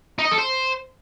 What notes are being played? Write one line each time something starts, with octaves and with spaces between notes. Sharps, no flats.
D#4
D#5
A4
C5